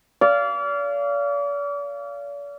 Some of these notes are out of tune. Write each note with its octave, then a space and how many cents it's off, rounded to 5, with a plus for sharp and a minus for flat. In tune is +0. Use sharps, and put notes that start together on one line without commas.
D5 -40 F5 -20